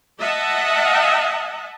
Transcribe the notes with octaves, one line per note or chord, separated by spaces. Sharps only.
D#5 E5 F#5 A5